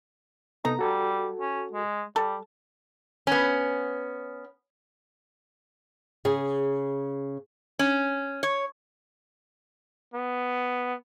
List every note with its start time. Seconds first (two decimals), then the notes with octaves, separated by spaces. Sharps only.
0.65 C3 B3 D#4 A4 A#5
0.79 G3 F#4 A4
1.41 C#4
1.72 G#3
2.16 G3 A4
3.27 B3 C#4
6.25 C#3 G#4
7.79 C#4
8.43 C#5
10.14 B3